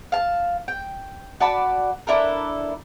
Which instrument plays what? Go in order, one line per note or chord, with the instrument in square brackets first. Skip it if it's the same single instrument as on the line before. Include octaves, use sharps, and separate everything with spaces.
[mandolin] F5 A5
G5
F#4 D5 A5 B5
D4 E4 A4 A#4